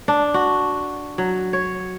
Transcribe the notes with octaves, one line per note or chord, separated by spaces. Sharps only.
D4
F#4
F#3
C#5